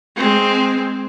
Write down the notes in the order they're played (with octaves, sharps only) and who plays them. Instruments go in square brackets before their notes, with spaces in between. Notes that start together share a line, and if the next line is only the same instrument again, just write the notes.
[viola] G#3 C4